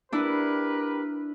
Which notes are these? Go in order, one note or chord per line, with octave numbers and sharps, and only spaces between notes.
D4 E4 G4 A#4 B4